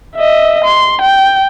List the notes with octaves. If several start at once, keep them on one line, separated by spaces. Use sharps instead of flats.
D#5 E5
C6
G5